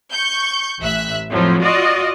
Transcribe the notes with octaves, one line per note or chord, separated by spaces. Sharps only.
C#6 G6
A1 E5 F#6
F2 A2 F3 F#3
F4 F#4 D5 D#5